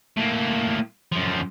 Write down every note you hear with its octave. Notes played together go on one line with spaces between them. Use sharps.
A2 A#3
F#2 F3